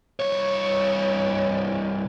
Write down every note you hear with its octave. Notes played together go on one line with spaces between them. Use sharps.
C2 C#5